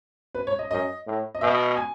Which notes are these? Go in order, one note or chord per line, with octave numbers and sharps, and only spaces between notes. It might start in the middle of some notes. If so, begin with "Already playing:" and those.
B4
C#5
D#5
F#2 D#5
A2
D#5
B2 E5
G#5